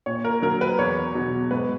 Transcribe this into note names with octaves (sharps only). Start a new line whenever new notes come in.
A#2 C#5
A#4
F#3 A#4
B4
E2 C#5
B2 F#3
G#2 B4